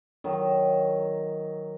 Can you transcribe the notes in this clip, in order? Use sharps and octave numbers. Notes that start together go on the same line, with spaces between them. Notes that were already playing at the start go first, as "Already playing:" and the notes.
D#3 F#3